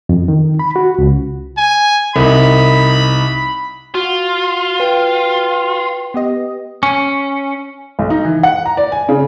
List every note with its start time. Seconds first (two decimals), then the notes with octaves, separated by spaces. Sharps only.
0.09 F2
0.28 D#3
0.59 B5
0.76 F#4
0.98 C#2
1.58 G#5
2.16 C2 D#4 B5
3.95 F4 F#4
4.80 B4 G5
6.14 B3 G4 D#5
6.83 C#4
7.99 B1
8.10 D#4
8.25 E3
8.43 F#5
8.66 A#5
8.77 D5
8.92 G#5
9.09 C#3